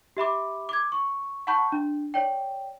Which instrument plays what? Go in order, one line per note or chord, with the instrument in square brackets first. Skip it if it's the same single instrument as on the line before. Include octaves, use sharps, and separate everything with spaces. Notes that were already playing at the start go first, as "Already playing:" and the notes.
[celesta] G4 E5 B5 D6
D6 G#6
C#6
F#5 A5 B5 C#6 G6
D4
C#5 D5 G5